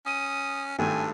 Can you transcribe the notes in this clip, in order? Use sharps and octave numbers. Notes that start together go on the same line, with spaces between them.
C#4 D#6
G#1 G2 A3 G#5